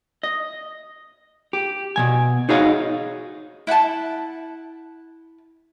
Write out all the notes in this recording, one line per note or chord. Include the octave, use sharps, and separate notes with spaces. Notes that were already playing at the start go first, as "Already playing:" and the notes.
D#5
G4
B2 D#3 G#5
D#4 F#4 G#4 C#5 D#5 F5
E4 F#5 G5 A5